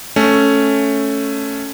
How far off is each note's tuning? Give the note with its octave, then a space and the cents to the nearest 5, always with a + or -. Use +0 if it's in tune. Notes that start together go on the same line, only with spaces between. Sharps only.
A3 +0 C#4 +0